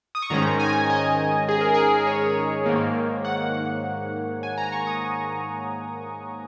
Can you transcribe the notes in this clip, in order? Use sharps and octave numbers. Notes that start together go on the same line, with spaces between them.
D#6
C#6
G#2 D#3 G#3 C#4 A#5
G#5
D#5
G#4
A#4
G#4
C#5
G#2 D#3 A#3
F#5
G#5
A#5
C#6
D#6